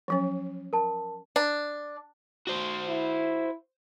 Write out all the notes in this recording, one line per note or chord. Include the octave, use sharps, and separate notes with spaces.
F3 F#3 C#4
A#4 A5
D4
F#4 C5
E4